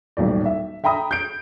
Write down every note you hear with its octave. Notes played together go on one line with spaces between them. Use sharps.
D#1 B1 A2 D5
E5
E5 G5 A#5 B5 D#6
G6 D7